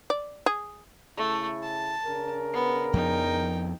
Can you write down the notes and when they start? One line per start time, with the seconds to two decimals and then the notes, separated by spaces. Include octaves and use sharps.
0.10 D5
0.46 G#4
1.17 C#3 A3 E4
1.63 A5
2.05 C#3 D4 A#4
2.54 B3
2.93 F2 F3 B3 D#4 G5